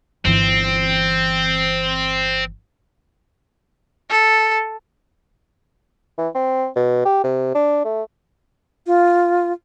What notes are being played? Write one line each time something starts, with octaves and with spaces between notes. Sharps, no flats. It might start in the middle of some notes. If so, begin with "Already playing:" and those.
G1 E3 C4
A4
E3
C4
B2
G4
C3
D4
A3
F4